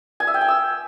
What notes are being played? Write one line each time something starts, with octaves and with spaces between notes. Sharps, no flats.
G#5
E5
G5
G#5
E6